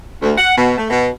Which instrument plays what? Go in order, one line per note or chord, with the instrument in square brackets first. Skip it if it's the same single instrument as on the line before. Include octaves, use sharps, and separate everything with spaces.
[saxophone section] D2
F#5
B2
A3
B2